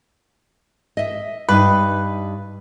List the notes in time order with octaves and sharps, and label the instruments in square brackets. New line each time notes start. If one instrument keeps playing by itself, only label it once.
[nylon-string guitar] D#5 E5
[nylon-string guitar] G2 D#4 [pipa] B4